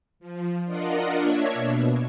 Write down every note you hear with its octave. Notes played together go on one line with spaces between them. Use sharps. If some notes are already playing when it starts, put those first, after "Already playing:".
F3
D4 F4 A#4 D#5 F#5
A#3 D4 C#5 E5 G#6
B2